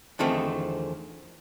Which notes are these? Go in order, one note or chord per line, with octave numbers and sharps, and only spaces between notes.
E2 D3 D#3 F3 A3 C4